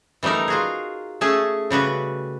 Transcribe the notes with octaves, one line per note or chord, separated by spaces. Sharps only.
E3 G3 A3 D#4 A#4
F4 F#4 G#4
A3 C#4 G#4 A5
C#3 G3 F#4 B4